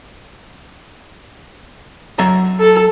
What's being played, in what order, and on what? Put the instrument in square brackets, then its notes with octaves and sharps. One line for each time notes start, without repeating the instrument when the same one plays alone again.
[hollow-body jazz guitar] F#3 E5 A#5
[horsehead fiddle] A4